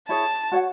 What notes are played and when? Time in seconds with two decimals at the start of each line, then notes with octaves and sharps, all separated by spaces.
0.09 E4 G#4 C#5 A5
0.52 F#4 C#5 F#5